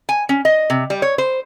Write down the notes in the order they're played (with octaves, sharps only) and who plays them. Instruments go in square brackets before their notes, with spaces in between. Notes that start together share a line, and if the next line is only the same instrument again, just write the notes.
[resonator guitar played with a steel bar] G#5
C#4
D#5
C3
G3
C#5
C5